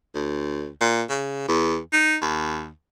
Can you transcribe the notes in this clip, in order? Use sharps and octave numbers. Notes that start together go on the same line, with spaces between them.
D2
A#2
C#3
E2
D#4
D#2